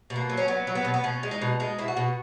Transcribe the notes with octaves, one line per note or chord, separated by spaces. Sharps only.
B2
A#3
F#3
C#4
F#3 B3
F#3
B3
B2
B3
B2 C#4
G#3
D#4
B2
G#3 D#4
B2 E4
F#4
B2